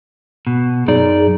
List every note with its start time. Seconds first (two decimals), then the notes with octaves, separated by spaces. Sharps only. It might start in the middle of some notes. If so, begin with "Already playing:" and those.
0.47 B2
0.88 F#2 D#4 G#4 D5